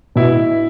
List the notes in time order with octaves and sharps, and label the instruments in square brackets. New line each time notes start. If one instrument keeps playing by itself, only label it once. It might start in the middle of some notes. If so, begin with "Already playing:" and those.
[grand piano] B2 [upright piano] E4